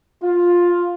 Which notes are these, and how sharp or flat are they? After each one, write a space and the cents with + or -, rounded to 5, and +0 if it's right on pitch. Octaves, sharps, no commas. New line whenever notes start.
F4 +10